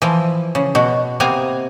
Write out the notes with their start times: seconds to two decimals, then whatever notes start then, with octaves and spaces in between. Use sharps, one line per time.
0.02 E3 F3
0.55 C#3
0.75 B2 F#4
1.20 C3 A#3 B3 G#5 A#5